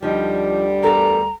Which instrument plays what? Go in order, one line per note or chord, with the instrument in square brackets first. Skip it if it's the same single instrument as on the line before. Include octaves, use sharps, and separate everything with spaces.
[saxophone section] D2 G3 [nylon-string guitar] F3 D#4
[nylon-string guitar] E2 A4 A#4 [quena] A#5